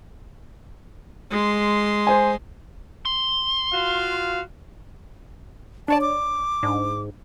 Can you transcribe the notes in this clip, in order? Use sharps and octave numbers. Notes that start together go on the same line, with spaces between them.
G#3 C6
C5 G#5
C6
F4 F#4 F5
D4 C#5 D5 A5
D6
G#2 D4